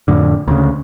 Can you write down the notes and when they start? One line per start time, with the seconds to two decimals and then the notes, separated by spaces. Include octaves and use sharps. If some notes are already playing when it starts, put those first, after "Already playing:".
0.08 F2 A2 D3
0.48 D2 C#3